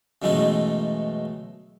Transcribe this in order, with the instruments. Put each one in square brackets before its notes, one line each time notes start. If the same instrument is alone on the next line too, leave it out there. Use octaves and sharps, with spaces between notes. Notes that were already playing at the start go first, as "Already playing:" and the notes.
[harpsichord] F#2 B2 E3 G#3 A3 D#4